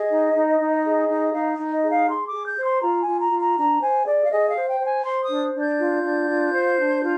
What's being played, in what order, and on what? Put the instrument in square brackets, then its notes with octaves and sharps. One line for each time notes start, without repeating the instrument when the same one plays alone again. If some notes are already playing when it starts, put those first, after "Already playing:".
Already playing: [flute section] G#4 D#5
D#4
D#4
D#4
G#4
D#4
D#4 F5
D#4
D#5
G#4
F5
G#4 C6
D6
G#4
G6
C5
C6
F4 A#5
G#5
F4
A#5
F4
A#5
D4 A#5
C5 G#5
G#4 D5
F5
G#4 D#5
F5
C5
G5
C5
G#5
C5 C6
D#6
D4
D4
G6
F4
D4
F4
C5
D4
F4